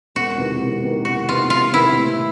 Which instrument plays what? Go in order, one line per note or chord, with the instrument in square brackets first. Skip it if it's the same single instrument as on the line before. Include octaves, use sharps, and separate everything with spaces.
[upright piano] E1 [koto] F#4
[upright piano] E2 C3 D#3
E1
E2 C3 D#3
[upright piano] E1 [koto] F#4
[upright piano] E2 C3 D#3 [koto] F4
[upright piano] E1 [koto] F4
[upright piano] E2 C3 D#3 [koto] E4
[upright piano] A2